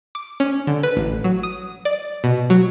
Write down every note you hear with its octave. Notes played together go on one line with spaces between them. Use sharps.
D6
C#4
D3
B4
A1
F#3
D#6
D5
B2
F#3